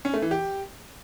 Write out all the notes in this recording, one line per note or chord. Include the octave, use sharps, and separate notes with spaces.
C#4
A3
E3
G4